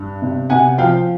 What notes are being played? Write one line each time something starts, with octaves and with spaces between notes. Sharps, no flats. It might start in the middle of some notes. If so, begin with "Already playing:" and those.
Already playing: G2
C3
C3 F#5 G#5
F3 F5 G5